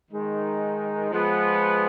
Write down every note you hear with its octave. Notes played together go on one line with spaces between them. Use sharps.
D#3 G#3 D#4
F3 G#3 B3